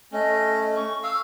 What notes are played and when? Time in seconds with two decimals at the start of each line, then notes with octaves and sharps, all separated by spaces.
0.13 A3 C#4 D#5
0.76 C#6
1.03 F5 E6